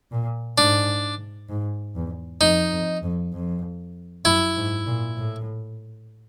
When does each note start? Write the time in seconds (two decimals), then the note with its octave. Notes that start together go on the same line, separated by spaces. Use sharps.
0.12 A#2
0.57 G#2 D4
1.49 G#2
1.95 E2
2.41 F2 D#4
2.72 F2
3.03 F2
3.33 F2
4.25 F#2 E4
4.56 G#2
4.86 A#2
5.17 A2